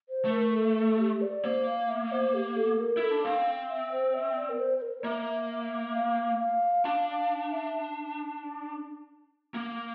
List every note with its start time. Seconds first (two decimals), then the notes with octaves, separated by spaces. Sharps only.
0.09 C5
0.25 A3
0.31 A#4
0.54 A4
0.77 A4
0.99 G4
1.21 D5
1.44 A#3 C5
1.67 F5
1.89 E5
2.12 C5
2.34 G4
2.56 A4
2.80 A#4
2.97 E4 A4
3.11 D4
3.24 C4 F5
3.69 E5
3.92 C5
4.14 E5
4.37 D5
4.49 A#4
4.59 C5
4.78 C5
4.82 A#4
5.04 A#3 E5
5.49 E5
5.95 F5
6.39 F5
6.85 D4 F5
7.08 F5
7.52 E5
9.54 A#3